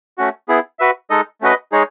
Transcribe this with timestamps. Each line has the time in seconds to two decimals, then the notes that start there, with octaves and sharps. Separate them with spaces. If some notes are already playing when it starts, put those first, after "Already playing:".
0.18 A3 C#4 F#4
0.48 B3 E4 G#4
0.79 F#4 B4 E5
1.10 G#3 D#4 A4 D#5
1.41 A3 C#4 F#4 B4 D#5
1.72 G#3 D#4 G#4 C#5